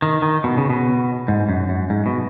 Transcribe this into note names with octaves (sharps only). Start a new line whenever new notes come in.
D#3
D#3
B2
C#3
B2
G#2
F#2
F#2
G#2
B2